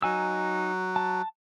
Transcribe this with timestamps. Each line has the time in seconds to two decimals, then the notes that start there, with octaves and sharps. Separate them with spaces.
0.02 F#3 D#4 G#5 E6
0.96 A5